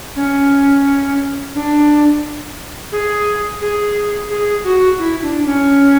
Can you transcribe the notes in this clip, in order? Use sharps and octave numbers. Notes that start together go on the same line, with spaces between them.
C#4
D4
G#4
G#4
G#4
F#4
E4
D4
C#4